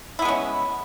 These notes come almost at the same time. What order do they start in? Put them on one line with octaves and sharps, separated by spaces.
E4 B3 G#3 C#4